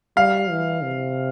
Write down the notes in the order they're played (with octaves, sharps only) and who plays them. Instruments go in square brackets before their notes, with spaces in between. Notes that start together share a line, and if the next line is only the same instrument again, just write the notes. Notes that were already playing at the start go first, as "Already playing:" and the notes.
[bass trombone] G3 [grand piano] F5
[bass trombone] E3
C3